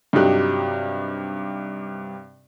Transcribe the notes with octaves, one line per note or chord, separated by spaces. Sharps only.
G2 C3 F#3 D#4 G4 F#6